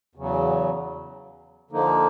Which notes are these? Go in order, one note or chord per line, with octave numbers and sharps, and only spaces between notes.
E2 C#3 F#3
D3 F3 A#3 D#4